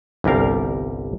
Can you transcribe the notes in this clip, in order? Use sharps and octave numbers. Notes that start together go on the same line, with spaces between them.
G1 C2 G3 A#4 F5